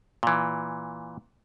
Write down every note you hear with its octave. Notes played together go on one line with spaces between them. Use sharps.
A#2 E3